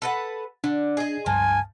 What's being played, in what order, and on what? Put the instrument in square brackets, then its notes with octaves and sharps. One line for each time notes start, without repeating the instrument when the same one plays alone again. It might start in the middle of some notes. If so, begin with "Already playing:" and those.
[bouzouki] A4 B4 F#5
[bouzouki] D3 [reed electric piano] D4
[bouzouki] G#4 D#5
[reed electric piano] C#2 G2 [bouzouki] F3 [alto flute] G#5